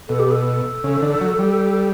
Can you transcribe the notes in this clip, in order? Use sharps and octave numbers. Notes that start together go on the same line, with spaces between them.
B2 A4
G4
A4
C#3
D3
F#3
G3